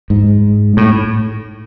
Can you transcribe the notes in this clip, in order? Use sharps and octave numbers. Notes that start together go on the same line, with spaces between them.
G#2
A2